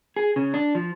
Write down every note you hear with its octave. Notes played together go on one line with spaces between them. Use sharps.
G#4
C#3
D4
F3